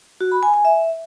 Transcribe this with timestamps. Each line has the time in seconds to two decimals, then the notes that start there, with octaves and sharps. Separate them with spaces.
0.21 F#4
0.32 B5
0.43 G#5
0.54 G#5
0.65 E5